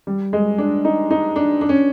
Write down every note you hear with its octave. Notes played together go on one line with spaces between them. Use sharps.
G3
G#3
D4
D#4
D#4
D4
D4
C#4